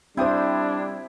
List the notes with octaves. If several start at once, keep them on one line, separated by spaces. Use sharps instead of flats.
G3 C4 D4 E4 C5 G5 D#6